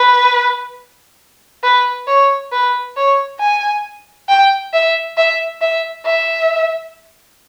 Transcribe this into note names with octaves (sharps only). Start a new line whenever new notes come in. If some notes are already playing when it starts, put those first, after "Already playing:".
Already playing: B4
B4
C#5
B4
C#5
G#5
G5
E5
E5
E5
E5